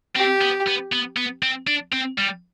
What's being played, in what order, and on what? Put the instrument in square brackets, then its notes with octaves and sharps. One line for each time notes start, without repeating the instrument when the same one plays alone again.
[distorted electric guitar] C4 [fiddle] G4
[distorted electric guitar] B3
B3
B3
B3
C4
D4
C4
G3